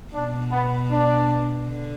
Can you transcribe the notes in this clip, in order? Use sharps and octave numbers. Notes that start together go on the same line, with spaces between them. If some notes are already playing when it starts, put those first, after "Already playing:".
B2 D4
B3
D4
D3